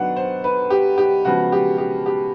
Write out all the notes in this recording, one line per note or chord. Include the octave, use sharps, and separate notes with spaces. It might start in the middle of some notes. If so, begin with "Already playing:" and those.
Already playing: D#3 F#3 B3 D4 F#5
C5
B4
G4
G4
C#3 F3 G#3 B3 F#4
G4
G4
G4